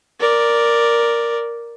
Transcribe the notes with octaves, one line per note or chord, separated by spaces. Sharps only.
A#4 D5